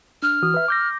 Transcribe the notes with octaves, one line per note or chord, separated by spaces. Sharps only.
D4 F6
E3 F#4 D#6
B4 E5
D6 G6 A#6